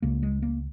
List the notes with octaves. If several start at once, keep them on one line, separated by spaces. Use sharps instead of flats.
C#2 C#3 A#3
G#3
A#3